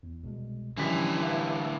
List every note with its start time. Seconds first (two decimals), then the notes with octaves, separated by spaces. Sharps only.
0.03 E2
0.24 C2 B2 G#3
0.77 D3 E3 F3 G3 C#4 E4 B6
1.23 B4 E5 F5